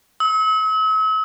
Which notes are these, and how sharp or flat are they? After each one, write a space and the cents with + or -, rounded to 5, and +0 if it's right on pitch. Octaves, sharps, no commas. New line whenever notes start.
E6 -45